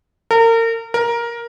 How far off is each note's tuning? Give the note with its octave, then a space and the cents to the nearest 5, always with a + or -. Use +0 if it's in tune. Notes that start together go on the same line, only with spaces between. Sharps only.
A#4 -35
A#4 +10